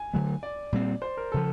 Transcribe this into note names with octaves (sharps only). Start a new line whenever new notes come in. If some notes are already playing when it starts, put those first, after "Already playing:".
Already playing: G#5
D3 F#3 A3
D5
A#2 G3 C4
C5
A#4
C#3 F3 A4